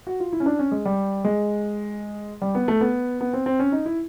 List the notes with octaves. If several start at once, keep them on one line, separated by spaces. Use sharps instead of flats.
F#4
F4
E4
C#4
D4
C#4
G#3
G3
G#3
G3
B3
A3
B3
B3
C4
C4
C#4
D#4
E4